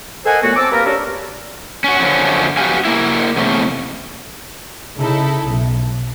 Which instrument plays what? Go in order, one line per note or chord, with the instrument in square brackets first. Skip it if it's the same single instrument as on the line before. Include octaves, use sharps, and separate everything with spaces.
[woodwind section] A4 A#4 C5 D#5 F#5 G#5
A#2 F#3 A3 B3 F#4
C4 A5 D6 E6
A#3 G4 A#4 B4
C#4 D4 F#4 G4 A4 A#4
[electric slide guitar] C#4 F#4
F#2 D3 F3 F#3 C#4
F#2 B3 F#4 G4 F5 G#5
A#3 E4
E2 C3 A3 C#4
[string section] C#3 D#4 E4 A4
B1